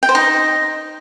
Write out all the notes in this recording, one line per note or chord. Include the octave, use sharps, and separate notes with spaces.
G5
C5
D#4